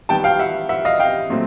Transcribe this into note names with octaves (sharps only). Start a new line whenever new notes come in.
D#3 G3 B3 G5 A5
F5 G5
E5 F#5
E5 F#5
D#5 F5
F5 G5
A#2 F#3 A3 C4